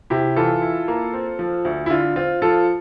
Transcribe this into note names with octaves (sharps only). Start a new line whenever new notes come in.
C3 E4 G4
E3 F4 A4
E4
A#3
C4
F3
D2
E4
D3 F4
C4 F4
F3 F4 A4